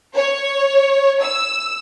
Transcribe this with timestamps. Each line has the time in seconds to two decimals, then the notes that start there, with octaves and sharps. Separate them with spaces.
0.15 C#5
1.21 E6